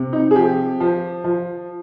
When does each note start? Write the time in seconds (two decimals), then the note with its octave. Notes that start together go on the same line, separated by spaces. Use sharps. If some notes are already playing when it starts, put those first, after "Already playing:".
Already playing: C3
0.13 D#4
0.31 G#4
0.36 F3 G4
0.80 F3
1.24 F3